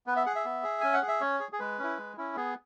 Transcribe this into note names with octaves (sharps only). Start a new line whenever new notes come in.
B3 B4
E5
G#4 F#5
E5
B3
G#4
C#4 G#5
F#5
G#4
E5
C#4 C#5
G#4
G#4
G#3 B4
C#4 E4
G#3
C#4 E4
B3 G#4